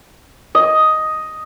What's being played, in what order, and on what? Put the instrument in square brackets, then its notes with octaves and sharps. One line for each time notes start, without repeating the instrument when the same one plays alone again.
[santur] D#5